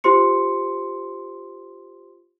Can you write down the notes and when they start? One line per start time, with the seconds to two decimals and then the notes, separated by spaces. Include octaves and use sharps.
0.04 F4 G4 C5 C6 C#7